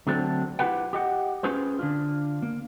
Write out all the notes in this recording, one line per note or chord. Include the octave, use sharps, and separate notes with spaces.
D3 F#3 A3 C4 D4
E4 F4 G4 G#4 B4 F#5
G4 D#5 F#5
C#4 F4 G#4 B4 C5
D3 D4 F4
A#3